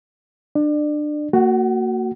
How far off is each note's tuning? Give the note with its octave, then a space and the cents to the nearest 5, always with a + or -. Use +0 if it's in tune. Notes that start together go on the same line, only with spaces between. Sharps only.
D4 +25 D5 +30
A#3 -30 F#4 +0 F#5 +40